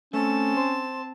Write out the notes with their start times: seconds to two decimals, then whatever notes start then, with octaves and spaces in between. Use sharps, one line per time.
0.13 A3 C4 C#4 A5
0.57 C5